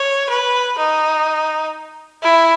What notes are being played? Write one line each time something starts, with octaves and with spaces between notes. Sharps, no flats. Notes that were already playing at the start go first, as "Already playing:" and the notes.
Already playing: C#5
B4
D#4
E4